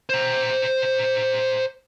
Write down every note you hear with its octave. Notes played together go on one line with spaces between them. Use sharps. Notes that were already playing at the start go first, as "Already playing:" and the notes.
C5 A#5